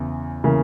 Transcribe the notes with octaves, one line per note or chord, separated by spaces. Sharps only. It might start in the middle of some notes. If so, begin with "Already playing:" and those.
Already playing: E2 C#3 E3
C#3 E3 A#3